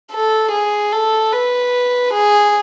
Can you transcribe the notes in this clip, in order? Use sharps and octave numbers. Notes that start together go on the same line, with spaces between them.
A4
G#4
A4
B4
G#4